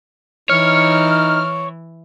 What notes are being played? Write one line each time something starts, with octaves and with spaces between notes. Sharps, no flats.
E3 D#4 C#5 F6